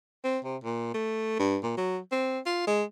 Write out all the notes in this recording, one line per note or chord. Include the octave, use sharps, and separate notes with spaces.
C4
C3
A#2
A3
G2
A#2
F#3
C4
F4
G#3